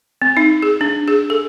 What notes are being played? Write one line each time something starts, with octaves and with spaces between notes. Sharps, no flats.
C4
D#4
G#4
D4
G#4
A4